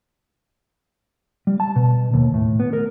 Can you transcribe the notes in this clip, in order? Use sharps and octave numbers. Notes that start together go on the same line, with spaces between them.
G3
A5
B2
D#2
A2
B3
A#4